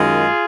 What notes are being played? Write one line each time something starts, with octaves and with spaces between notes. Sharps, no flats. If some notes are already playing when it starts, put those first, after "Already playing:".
Already playing: F#2 D#3 G#3 F4 G#4